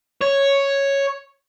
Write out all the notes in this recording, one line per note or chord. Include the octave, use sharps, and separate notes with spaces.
C#5